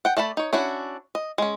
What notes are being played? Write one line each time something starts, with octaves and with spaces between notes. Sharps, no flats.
F#5 G5
A3 D5 A5 B5
D#4 C#5
C#4 D4 E4 F#4
D#5
G#3 C#4